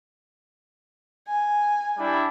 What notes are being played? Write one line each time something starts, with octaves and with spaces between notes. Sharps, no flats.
G#5
G3 D4 E4